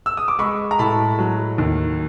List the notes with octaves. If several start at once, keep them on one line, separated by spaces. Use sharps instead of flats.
E6
D#6
D6
G#3 B5 C#6
A#5
A2 A5 B5
F#3
D#2